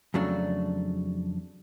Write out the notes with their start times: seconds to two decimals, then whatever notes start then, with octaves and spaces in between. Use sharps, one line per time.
0.14 F2 C#3 F#3 A3 D4